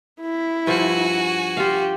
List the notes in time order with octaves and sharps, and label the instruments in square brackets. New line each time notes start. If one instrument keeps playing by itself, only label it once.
[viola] E4
[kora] G2 F3 [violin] F#4 G#5
[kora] F4 F5 [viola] G4